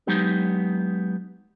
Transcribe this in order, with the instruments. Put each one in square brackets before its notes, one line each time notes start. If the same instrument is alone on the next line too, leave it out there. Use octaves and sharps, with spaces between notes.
[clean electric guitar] F#3 G#3 B3 D#4 G4